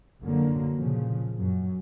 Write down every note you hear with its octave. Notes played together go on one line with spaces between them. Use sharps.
F#1 D3 F#3 A#3
A#2 C#3 F3
F#2